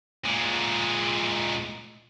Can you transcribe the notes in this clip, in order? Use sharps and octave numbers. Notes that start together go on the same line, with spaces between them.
A#2 G#3